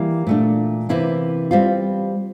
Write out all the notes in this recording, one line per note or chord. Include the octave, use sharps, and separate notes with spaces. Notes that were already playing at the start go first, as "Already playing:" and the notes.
Already playing: E3 G3 A#3 E4 G4
A#2 A3 D4
C3 E3 A#3 E4
G3 C4 F4